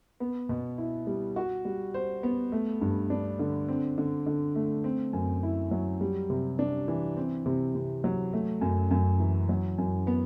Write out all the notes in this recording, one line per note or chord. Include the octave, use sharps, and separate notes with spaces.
B3
B2
E4
G3
F#4
G3
C5
B3
A3
G2
D4
D3
C4
D3
D3
A3
C4
F#2
E4
F#3
G3
C3
D4
E3
C4
C3
C3
F#3
A3
F#2
F#2
E3
F#3
F#2
B3